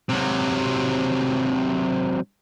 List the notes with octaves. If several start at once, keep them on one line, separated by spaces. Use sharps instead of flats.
C3 F#3